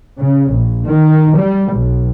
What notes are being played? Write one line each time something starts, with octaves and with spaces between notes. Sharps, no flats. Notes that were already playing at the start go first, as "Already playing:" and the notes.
C#3
A#1
D#3
G3
B1